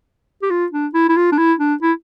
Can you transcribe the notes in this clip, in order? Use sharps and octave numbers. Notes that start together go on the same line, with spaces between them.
G4
F4
D4
E4
E4
F4
D4
E4
D4
E4